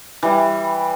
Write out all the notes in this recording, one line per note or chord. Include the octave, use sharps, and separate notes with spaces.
E3 G3